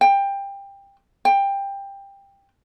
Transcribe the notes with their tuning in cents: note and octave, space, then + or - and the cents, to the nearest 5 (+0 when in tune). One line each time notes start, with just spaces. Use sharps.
G5 +20
G5 +15